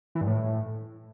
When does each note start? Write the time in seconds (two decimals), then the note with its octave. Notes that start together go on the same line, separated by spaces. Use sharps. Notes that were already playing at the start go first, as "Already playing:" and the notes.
0.15 E3
0.21 G2
0.27 A2